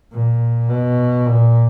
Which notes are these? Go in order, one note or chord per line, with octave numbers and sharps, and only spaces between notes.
A#2
B2
A#2